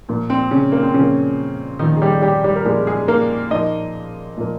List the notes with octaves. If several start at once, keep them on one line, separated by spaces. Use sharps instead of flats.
A#2 F3 A#3
C4
C#3 C#4
A#3
C4
A#2 C#3 F3 A#3 C#4
A#2 D#3 F3 A#3 D#4
G#4
G3 G4
G3 G4
G3 G4
A#4
A#2 F3 G#3 A#3 G#4
G#3 G#4
A#3 A#4
A#2 F3 A#3 D#4 D#5
A#2 F3 A#3